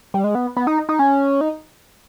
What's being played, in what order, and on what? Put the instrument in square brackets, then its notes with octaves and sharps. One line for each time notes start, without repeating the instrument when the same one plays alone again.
[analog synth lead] G3
G#3
B3
B3
D#4
D#4
C#4
D#4